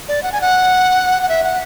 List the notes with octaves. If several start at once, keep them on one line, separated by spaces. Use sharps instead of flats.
D5
F#5
G#5
F#5
F#5
E5
F#5